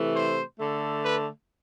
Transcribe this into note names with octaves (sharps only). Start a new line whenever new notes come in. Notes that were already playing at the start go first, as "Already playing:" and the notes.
Already playing: C3 E3 A3
C5
D3 A3
B4